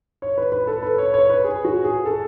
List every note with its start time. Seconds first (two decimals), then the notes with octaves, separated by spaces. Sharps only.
0.22 C#5
0.38 B4
0.52 B4
0.67 A4
0.83 B4
0.98 C#5
1.14 C#5
1.30 B4
1.44 G#4
1.65 F#4
1.84 G#4
2.05 A4